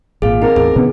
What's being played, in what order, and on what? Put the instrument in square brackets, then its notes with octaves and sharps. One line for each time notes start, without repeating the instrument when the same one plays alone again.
[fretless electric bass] G#1 A#2 [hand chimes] G#4 F5
[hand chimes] C4 D#4 [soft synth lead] A#4
[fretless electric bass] A1 E2 [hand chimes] G#4
[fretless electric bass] B2 D3 C#4 [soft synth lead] B3